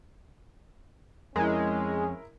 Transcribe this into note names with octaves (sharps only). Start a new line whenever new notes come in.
F2 G#3 C#4 E4 A#4